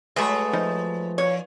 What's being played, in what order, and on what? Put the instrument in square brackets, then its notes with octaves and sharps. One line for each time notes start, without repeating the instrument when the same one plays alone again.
[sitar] F#3 B4 E5 [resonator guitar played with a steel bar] G#3 A3
[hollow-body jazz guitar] F3 D#4 C5
[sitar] A#2 [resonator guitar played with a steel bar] C#5